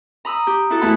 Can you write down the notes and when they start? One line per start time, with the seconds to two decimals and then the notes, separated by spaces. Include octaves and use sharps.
0.25 A#5 B5 D#6 E6
0.47 G4
0.70 E4 F#4 A4
0.81 E2 A3 E4 F#5 A5 B5